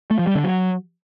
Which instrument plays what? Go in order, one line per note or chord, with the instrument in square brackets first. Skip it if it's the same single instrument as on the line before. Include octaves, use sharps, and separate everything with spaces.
[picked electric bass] A3
F3
G3
D3
F#3